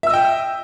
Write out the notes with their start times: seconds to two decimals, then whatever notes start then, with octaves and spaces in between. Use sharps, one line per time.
0.03 E5
0.07 E6
0.10 D#5
0.13 G5